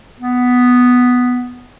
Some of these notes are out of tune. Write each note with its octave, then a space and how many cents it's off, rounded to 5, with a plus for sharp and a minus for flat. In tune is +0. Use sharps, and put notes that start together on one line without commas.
B3 +5